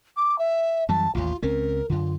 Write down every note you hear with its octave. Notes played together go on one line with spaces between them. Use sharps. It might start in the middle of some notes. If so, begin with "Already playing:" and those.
D6
E5
F#2 E3 G3 A5
A1 D#2 F4
C#2 C4 C#4 A#4
F#2 D3 F4